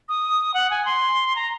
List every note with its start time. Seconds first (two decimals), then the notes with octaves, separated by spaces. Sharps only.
0.09 D#6
0.54 F#5
0.70 G#5
0.85 C6
1.36 A#5